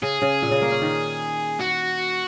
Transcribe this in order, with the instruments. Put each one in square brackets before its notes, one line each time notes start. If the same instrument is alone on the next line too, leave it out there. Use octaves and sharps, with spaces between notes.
[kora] C#3 [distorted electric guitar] G#4
[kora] C#3
A#2
C#3
A#3
C#4
D#3
[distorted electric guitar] F#4